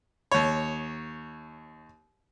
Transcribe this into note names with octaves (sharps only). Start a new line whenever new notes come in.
D#2 C#5